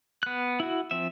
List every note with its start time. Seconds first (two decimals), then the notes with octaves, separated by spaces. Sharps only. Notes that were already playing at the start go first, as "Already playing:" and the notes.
0.23 B3 F#6
0.60 E4 F#4
0.91 F3 C4 E5